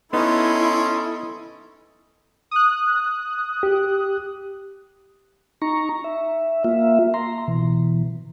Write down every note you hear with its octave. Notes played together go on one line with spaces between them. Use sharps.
B3 C#4 D#4 E4 A4 D#5 C6
D#6 F#6
G4
D#4 A#5 C#6
E5
A#3 F4 E5
A#5 C6
B2 E3